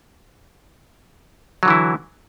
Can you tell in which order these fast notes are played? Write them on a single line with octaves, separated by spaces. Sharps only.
F#3 D3 E3 E4